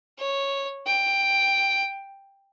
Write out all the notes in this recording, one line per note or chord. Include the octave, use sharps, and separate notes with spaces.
C#5
G5